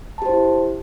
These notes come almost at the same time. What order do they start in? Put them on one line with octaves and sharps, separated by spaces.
A5 G4 C5 E4